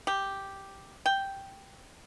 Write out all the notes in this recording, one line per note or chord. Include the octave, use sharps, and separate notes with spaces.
G4
G5